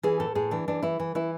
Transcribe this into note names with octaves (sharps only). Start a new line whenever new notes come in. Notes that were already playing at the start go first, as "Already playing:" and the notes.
E3 G#4
A2 A4
A2 G#4
E3 D4
E3 D4
E3 E4
E3
E3 E4